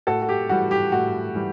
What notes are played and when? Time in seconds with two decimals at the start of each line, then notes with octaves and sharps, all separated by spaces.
0.07 A2 F#4 A4
0.22 F#4
0.29 G4
0.49 E3 G3 F#4
0.71 G4
0.92 A2 F#4
1.35 E3 G3